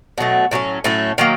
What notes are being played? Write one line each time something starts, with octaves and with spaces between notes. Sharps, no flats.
B2 F#3 A3
A2 F#3 A3 C#4
A2 F#3 A3 C#4
D#3 F#3 A#3